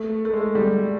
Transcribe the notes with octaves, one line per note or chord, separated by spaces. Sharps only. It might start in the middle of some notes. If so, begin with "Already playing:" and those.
Already playing: A3
A3
G#3
G3